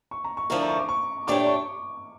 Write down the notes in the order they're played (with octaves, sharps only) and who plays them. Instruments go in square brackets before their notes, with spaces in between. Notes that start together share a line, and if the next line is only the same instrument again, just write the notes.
[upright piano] C#6
A#5
C#6
[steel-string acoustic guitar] D3 F3 A3 E4 A#4 [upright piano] C#6
[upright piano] A#5
C#6
D6
C#6
[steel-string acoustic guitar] A#2 A3 D4 G4 C#5 [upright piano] D6
[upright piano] C#6